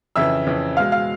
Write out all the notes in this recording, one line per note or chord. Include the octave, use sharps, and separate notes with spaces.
F2 C#3 E3 E5 E6
F2 C#3 E3
B2 G#3 F5 F6
F5 F6